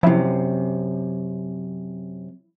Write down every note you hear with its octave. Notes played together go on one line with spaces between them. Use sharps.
F#2 C3 F3 E4